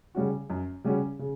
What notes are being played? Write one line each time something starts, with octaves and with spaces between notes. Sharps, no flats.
C#3 G3 C#4 F#4
F#2
C#3 G3 C#4 F#4
C#3